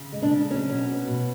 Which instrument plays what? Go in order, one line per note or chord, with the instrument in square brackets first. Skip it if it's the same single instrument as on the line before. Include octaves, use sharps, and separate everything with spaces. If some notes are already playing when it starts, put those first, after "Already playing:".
Already playing: [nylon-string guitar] C#3
G#3
D4
C#3
F#3 C#4
B2
B3
B2